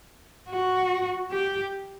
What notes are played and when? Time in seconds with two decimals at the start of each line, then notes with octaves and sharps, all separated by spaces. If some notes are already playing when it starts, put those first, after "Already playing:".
0.49 F#4
1.31 G4